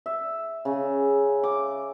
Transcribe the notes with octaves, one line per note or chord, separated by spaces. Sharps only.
E5
C#3
D6